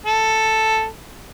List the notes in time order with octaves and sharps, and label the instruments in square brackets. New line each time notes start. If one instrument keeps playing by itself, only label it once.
[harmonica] A4